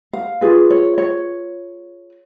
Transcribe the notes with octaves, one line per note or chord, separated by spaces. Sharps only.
F5
F4 G#4 B4
C#5
C#5